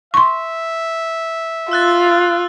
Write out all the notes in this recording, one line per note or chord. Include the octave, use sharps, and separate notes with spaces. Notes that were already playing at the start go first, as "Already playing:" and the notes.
E5 C6 C#6
F4 E6 F#6 A6